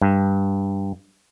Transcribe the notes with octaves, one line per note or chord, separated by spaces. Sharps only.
G2